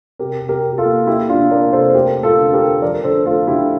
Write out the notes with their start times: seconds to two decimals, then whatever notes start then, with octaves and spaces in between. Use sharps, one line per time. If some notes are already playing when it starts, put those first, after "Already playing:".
0.19 C3 G4 A#4
0.42 C3
0.49 G4 A#4
0.64 C3
0.72 G4
0.78 F4 A4
0.85 A#3
1.07 A#3 E4 G4
1.29 C3 D4 F4
1.51 A#3 A#4 D5
1.73 C3 A4 C5
1.89 C5
1.94 A3 G4 A#4
2.17 A3
2.23 F4 A4
2.38 D3
2.53 G4 A#4
2.60 A3
2.82 F3 A#4 D5
3.04 D3 A4 C5
3.26 A3 F4 A4
3.47 D3 E4 G4